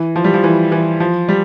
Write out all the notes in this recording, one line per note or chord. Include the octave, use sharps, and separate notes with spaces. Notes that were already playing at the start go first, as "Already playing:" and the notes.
Already playing: E3
F3
G3
F3
E3
E3
F3
G3